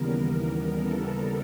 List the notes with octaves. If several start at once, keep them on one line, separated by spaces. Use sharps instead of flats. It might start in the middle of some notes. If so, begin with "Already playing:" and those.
Already playing: D#2 C#3 E3 G3 B3 A#4
A4